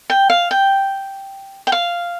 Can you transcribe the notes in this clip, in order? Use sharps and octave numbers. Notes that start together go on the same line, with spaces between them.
G5
F5
G5
G5
F5